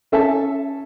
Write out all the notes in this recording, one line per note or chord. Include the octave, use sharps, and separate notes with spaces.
C#4 A4 E5 G#5 A5